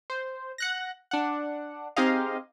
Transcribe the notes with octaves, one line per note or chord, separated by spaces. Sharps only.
C5
F#5 F#6 A#6
D4 F#5
C4 D#4 G4 G#4 D#5 F5